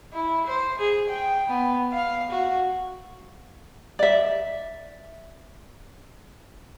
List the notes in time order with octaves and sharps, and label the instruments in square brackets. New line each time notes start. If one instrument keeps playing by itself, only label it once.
[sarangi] E4
C5
G#4
G5
B3
F5
F#4
[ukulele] D5 E5